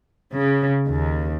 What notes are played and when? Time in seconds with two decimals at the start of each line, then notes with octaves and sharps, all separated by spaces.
0.32 C#3
0.87 D#2